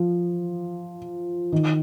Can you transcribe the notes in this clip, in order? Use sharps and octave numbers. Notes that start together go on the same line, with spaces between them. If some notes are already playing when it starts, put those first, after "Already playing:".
Already playing: F3
D#3